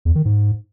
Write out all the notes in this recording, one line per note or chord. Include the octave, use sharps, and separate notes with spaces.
E2
D#3
G#2